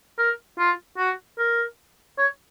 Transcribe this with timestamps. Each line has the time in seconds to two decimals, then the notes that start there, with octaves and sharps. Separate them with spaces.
0.18 A#4
0.59 F4
0.98 F#4
1.38 A#4
2.18 C#5